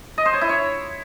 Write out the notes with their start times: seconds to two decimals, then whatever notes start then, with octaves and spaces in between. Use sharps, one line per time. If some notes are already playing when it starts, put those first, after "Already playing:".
0.18 D#5
0.26 C5
0.33 C#5
0.41 E4
0.49 C#5